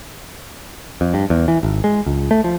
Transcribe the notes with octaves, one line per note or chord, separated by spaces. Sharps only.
F2
G2
E2
E3
G#1
G#3
C#2
A3
F3